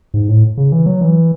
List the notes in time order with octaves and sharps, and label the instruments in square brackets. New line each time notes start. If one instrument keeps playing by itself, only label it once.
[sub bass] G#2
A2
C#3
E3
F#3
E3